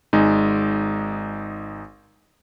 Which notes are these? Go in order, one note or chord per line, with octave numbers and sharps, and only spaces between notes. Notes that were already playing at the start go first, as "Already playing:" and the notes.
G#1 G#3 D#4